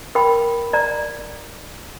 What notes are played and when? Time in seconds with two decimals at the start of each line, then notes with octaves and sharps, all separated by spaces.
0.15 A#4 G5 B5
0.73 D5 A#5